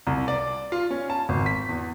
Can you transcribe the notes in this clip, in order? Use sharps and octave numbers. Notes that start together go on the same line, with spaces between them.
C2
D5
F4
C#4
A5
G#1
B6
E2